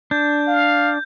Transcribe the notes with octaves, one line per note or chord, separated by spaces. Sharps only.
D4 G6
F5